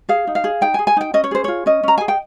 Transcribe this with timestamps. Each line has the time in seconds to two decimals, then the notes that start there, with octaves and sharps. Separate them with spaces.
0.09 G#4 F5
0.27 D#4
0.35 F5
0.44 G#4
0.61 D#4 G5
0.74 G#5
0.79 G#4
0.87 G#5
0.97 D#4 G5
1.14 C#4 D#5
1.24 C#5
1.31 G#4 C5
1.44 F4 C#5
1.66 C#4 D#5
1.83 C#4 A#5
1.98 G#4 G#5
2.08 G5